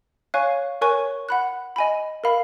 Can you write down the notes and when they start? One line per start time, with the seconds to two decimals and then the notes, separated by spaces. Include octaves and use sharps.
0.34 C#5 F5 G#5 C#6 F#6
0.81 A#4 C#5 G#5 C#6 F#6
1.29 F#5 B5 F#6
1.76 D#5 G#5 B5
2.24 A#4 F5 B5